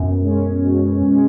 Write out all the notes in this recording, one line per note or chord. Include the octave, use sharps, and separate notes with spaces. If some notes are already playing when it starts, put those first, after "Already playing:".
Already playing: F#2 B2
G#3 C#4
B2
G#3 C#4